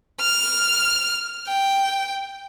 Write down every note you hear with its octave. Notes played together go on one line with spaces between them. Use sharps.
F6
G5